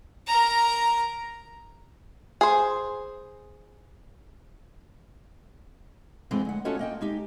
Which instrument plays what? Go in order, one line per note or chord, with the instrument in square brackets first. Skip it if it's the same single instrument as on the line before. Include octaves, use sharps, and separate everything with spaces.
[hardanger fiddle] A#4 A#5
[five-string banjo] G#4 C5
[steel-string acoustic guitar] F2 E3 G#3 B3 C4
D2 F#5
C#4 F4 F#4 A4 C#5 D#5
A#3 D#5 G5
G#3 D#4 G4